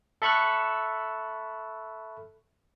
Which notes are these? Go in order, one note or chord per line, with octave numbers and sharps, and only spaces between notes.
A4 E5 B5 C#6 F6 F#6